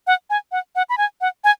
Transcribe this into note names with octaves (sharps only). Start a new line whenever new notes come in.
F#5
G#5
F#5
F#5
B5
G#5
F#5
G#5